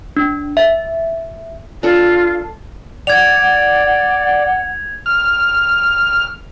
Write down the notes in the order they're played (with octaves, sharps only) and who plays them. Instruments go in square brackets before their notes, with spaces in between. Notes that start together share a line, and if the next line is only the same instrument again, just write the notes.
[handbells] D4
E5
[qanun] D4 A4 [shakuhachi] F4
[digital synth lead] D5 [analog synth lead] F#5 [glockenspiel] G#6 F7
[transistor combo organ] F6